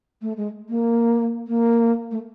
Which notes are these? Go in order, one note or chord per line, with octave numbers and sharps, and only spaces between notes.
A3
G#3
A#3
A#3
A3